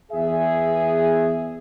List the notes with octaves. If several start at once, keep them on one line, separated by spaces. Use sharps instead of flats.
E2 G#4 E5